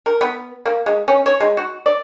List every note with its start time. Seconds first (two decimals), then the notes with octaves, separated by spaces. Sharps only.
0.06 A#4
0.21 B3
0.65 A#3
0.86 G#3
1.08 C#4
1.26 C#5
1.40 G#3
1.57 F#4
1.86 D5